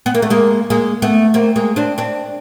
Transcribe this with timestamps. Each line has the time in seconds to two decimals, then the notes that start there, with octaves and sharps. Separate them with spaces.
0.06 B3
0.15 A#3
0.22 A3
0.30 G#3 A#3
0.70 G#3 A#3
1.02 A3 B3
1.34 A#3 C4
1.56 G#3 A#3
1.76 C4 D4
1.98 C4 D4